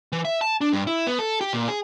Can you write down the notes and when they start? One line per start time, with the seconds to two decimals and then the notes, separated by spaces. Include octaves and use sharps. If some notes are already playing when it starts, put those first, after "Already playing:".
0.12 E3
0.25 E5
0.41 A5
0.61 D4
0.73 G2
0.87 E4
1.07 B3
1.19 A4
1.41 G4
1.53 A#2
1.68 G#4